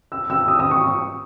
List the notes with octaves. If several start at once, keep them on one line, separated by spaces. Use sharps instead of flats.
E6
E6
D#6
D#6
C#6